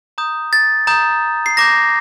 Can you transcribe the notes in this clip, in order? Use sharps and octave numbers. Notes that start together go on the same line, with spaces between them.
A#5 D#6 G6
A6
A#5 D#6 G6
C7
A#5 D6 G6 A#6